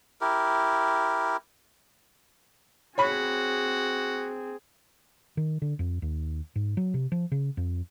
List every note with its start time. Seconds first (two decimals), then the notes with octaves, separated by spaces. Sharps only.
0.21 E4 G4 A#4
2.98 C4 F#4 G#4 C#5 B5
5.37 D#3
5.62 D3
5.79 F2
6.02 D#2
6.56 G#2
6.77 F#3
6.94 C3
7.12 F3
7.32 C#3
7.57 F2